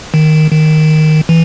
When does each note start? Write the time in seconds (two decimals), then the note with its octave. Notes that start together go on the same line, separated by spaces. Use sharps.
0.14 D#3
0.52 D#3
1.29 E3